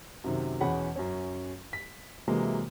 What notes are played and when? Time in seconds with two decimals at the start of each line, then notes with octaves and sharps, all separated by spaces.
0.24 F#2 C3 D#3
0.61 E2 B2 C#4 G#4 F#5 B5
0.96 F#2 C#4 C#5
1.73 B6
2.28 C3 E3 F#3 G#3 A#3